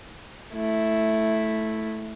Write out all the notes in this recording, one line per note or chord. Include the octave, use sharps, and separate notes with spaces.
A3 E4